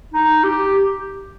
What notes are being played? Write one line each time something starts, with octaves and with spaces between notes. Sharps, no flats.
D#4
G4